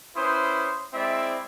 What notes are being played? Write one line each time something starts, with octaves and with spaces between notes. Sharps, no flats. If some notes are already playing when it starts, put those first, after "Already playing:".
C#4 E4 B4 C5 C6 D#6
G#3 C4 E4 D5 E5